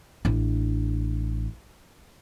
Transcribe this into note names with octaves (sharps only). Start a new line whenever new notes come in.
A1 D4